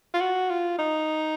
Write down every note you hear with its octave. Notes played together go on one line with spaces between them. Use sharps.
F4
F#4
F4
D#4